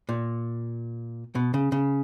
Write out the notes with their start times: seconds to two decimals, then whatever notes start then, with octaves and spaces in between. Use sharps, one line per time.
0.09 A#2
1.35 B2
1.54 C#3
1.72 C#3